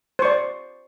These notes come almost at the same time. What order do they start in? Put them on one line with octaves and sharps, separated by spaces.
C5 C#6 D5